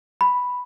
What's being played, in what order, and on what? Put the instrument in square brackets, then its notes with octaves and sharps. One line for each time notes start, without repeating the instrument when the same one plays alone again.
[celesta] B5